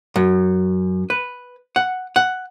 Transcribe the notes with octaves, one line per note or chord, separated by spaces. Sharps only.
F#2
B4
F#5
F#5